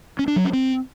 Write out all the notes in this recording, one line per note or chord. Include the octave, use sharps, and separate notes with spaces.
C#4
D4
F#3
C#4
C4